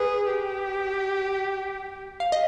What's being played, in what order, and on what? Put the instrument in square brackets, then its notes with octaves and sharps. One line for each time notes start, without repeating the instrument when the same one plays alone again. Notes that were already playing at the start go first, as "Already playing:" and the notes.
Already playing: [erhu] G#4 [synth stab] B4
[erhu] G4
[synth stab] F5
D#5